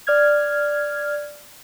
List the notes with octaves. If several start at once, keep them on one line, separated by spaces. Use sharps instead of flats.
D5 F6 G#6